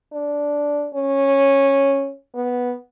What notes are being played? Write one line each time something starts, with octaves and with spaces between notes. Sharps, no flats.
D4
C#4
B3